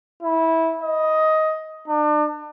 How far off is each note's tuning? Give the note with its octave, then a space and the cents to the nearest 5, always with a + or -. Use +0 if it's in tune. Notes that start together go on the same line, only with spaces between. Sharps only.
E4 -15
D#5 +10
D4 +35